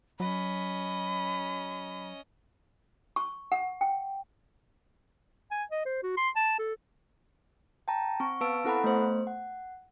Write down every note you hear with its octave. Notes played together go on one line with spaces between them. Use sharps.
F#3 C#4 D#5 B5
C#6
F#5
G5
G#5
D#5
C5
F#4
C6
A5
A4
G5 A5 A#5
C4 C#6
B3 B4 F5 A5 E6 D7
C4 E4 A4 F#5 A#5 B5
A3 B3 C5
F#5